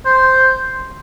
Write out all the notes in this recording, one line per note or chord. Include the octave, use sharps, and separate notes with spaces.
C5